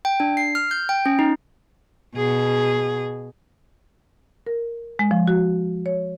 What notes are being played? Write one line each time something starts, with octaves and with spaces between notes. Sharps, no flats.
G5
D4
C7
F6
G6
G5
C#4
D#4
B2 G#4
A#4
G#3
F3
F#4
C#5